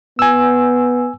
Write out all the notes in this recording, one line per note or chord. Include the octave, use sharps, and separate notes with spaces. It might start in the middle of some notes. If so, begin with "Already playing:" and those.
B3 G#5 E6